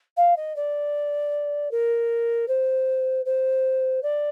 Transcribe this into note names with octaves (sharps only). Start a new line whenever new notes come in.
F5
D#5
D5
A#4
C5
C5
D5